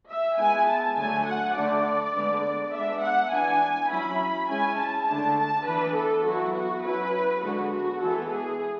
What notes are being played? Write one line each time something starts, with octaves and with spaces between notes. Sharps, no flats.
E5
G#3 B3 E4 G#5
A5
D3 F#3 A3 G#5
F#5
D3 A3 D4 D5
D3 G#3 B3 D4
G#3 B3 D4 E5
F#5
E3 B3 D4 G#5
F#3 C#4 E4 B5
G#3 C#4 E4 G#5
A5
D3 A3 D4 A5
A5
E3 B3 D4 B4
A4
F#3 B3 E4 F#4
F#4
F#3 C#4 E4 B4
D3 G#3 B3 F#4
F#4
E3 G#3 B3 E4 A4
G#4